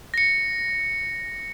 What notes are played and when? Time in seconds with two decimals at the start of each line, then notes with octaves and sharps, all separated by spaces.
0.14 A#6 C#7